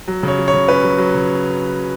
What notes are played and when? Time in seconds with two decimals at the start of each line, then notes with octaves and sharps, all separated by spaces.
0.08 F#3
0.23 C#3 C#5
0.38 F#3
0.48 C#5
0.53 C#3
0.68 C#4 B4
0.83 F#3
0.98 F#3
1.14 C#3